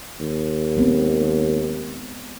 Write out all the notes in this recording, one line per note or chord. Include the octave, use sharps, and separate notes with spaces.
D#2
G#3 B3 C4